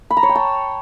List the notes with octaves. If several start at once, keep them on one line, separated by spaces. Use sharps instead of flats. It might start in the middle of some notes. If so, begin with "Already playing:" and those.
B5
A#5
C#5
G5
A5